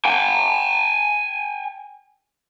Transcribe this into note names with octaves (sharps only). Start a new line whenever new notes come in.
G5 G#5